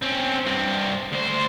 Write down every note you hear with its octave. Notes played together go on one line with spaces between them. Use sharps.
C4 C#4
G2 C4
D2 C5